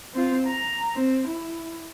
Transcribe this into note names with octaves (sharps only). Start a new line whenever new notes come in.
C4 F4
A#5
C4
E4